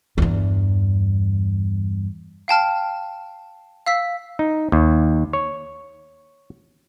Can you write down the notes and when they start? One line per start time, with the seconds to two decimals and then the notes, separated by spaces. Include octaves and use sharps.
0.18 E2 G2
2.48 F5 G5 A5 F6
3.86 F5 E6 B6
4.39 D#4
4.72 D#2
5.33 C#5